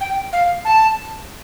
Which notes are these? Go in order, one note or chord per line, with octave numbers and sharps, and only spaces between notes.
G5
F5
A5